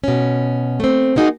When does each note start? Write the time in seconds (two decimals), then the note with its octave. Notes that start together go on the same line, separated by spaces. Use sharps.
0.04 B2 C#4
0.80 A3 C4
1.15 G#3 A#3 B3 D#4 F#4 G#4